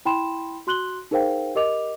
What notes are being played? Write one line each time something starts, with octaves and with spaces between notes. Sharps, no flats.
E4 G5 B5 C6 E7
F#4 C6 F#6 F#7 G7
D#4 G#4 A#4 C5 F5 G5
G4 A#4 D#5 D6 F7